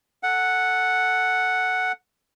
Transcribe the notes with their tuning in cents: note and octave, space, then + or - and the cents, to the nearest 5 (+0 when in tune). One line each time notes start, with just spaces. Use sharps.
A4 +0 F#5 +0